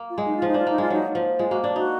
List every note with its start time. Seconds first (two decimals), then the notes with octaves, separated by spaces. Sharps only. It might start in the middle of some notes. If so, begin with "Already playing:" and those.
Already playing: A#3
0.10 F4
0.18 G#3
0.26 D#4
0.37 F4
0.42 F3
0.48 D#4
0.54 D4 F4
0.67 A#3 D#4
0.78 G#3 F4
0.90 F#3 D#4
1.15 F3
1.39 G#3 F4
1.51 A#3 F#4
1.64 D4
1.76 D#4 F#4